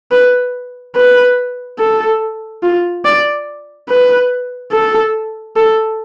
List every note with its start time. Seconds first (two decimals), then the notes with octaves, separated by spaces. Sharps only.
0.11 B4
0.96 B4
1.79 A4
2.63 F4
3.05 D5
3.89 B4
4.72 A4
5.56 A4